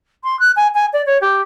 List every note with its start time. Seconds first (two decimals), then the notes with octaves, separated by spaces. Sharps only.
0.24 C6
0.39 F#6
0.56 G#5
0.74 G#5
0.93 D5
1.06 C#5
1.21 G4